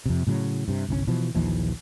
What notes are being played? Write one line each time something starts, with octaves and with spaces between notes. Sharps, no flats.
F2 C3
A2 C#3 F#3
G2 C3
G1 C2 B2 C#4
B2 E3 F3
A#1 D#2 E3 F3